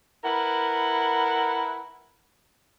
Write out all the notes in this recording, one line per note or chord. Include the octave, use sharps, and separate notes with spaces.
E4 A#4 B4 F#5